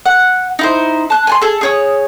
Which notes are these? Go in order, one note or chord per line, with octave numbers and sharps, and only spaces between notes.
F#5
D#4 E4 C5
A5 F#6
G#5 A5 C6
G#4 A4
G#4 C#5 D#6